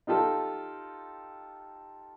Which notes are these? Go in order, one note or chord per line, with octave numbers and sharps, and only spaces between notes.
D#4 F4 G4 A4